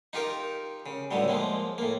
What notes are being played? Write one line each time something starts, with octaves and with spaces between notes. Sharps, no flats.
D#4 F4 G4 A#4
C#3
C#2 A2 D3 F#3 G3
F3 G#3 A#3
A2 A#3